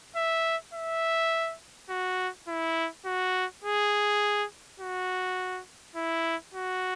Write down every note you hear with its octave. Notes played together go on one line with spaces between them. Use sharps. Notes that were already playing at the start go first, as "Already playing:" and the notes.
E5
E5
F#4
E4
F#4
G#4
F#4
E4
F#4